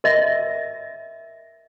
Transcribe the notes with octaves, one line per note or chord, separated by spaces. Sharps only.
A#4 D#5 E5